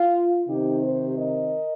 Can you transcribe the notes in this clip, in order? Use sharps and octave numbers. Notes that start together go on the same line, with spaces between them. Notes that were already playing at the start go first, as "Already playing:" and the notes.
Already playing: F4
C3 D#3 C4 D#4 G4
G4 C5
A#4 D#5